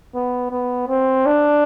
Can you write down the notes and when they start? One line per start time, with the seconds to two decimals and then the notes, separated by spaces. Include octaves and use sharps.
0.15 B3
0.51 B3
0.89 C4
1.26 D4